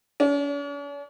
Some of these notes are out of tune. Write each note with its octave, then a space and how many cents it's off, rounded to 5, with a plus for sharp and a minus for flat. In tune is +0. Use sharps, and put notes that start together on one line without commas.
C#4 +45